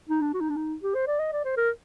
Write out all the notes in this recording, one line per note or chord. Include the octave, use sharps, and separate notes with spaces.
D#4
D4
F#4
D#4
D4
D#4
G4
C5
D5
D#5
D5
C5
A#4